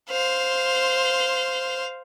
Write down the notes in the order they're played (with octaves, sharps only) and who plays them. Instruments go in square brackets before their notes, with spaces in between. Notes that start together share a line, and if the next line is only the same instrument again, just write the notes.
[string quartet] C5 F5